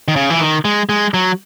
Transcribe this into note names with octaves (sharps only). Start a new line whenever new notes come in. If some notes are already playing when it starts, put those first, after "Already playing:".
D#3
C#3
E3
D#3
G#3
G#3
F#3